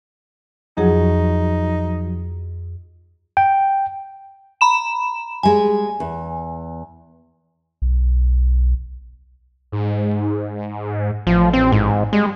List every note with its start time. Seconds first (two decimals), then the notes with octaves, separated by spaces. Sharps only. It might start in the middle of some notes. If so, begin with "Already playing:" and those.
0.77 F2 F3 F#3 D#4 F#4 G#4
3.37 G5
4.61 A#5 B5 E7
5.43 G3 G#3 G#5
6.00 E2
7.82 B1
9.72 G#2
11.27 A1 F3
11.53 C4
11.72 G#2
12.13 G3 G#3